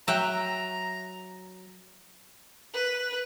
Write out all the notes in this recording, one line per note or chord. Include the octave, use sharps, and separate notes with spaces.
F#3 E5 F#5 G5 A#5
B4